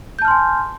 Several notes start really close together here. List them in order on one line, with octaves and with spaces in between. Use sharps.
G6 A5 F6 C6 G#5